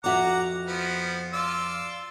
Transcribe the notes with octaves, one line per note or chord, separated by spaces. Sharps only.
F2 F#4 E5 F#5 A#5 D6
F3 B3
F4 D5 E6